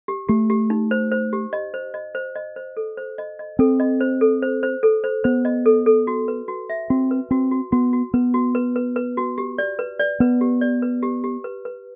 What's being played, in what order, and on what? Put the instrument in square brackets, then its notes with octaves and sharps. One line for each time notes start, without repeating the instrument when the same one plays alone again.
[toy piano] G4
[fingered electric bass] A3 [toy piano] G4
[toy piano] G4
D#4
C5
C5
G4
D#5
C5
D#5
C5
D#5
C5
A4
C5
D#5
D#5
[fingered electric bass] C4 [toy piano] A4
[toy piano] D#5
C5
A4
C5
C5
A4
C5
[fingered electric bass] B3 [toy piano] C5
[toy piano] D#5
A4
A4
F#4
B4
F#4
E5
[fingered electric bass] C4 [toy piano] F#4
[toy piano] B4
[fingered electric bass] C4 [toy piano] F#4
[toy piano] F#4
[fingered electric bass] B3 [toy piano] F#4
[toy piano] F#4
[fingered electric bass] B3 [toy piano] B4
[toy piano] F#4
B4
B4
B4
F#4
G4
D5
B4
D5
[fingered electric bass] B3 [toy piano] B4
[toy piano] G4
D5
B4
G4
G4
B4
B4